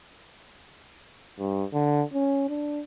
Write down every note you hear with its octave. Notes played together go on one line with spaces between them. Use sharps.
G2
D3
C#4
D4